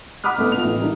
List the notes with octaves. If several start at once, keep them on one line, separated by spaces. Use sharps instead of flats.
F#5 B5 D6 D#6 F6 F#6
G1 A3 B3
F4 F7
A1
D#3 E3 G3 D4 D#4